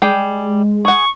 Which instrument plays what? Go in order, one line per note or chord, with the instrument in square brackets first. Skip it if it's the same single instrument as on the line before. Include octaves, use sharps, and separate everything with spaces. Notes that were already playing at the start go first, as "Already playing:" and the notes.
[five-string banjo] G3 G#4 G5 [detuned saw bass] G#3
[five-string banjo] G#4 F#5 [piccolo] C#6